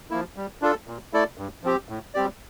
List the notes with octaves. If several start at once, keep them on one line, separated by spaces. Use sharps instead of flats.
F3 A#3 E4
G3
D4 F4 A4
A#2
A3 E4 A4 D5
G2
F3 C4 G4
A2
G3 C4 G4 D5